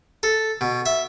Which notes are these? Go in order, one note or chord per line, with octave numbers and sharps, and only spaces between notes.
A4
B2
E5